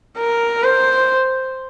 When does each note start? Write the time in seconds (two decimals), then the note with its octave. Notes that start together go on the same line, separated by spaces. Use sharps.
0.18 A#4
0.64 C5